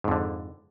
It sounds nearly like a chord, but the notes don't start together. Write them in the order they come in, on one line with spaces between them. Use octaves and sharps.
G#2 F2 D3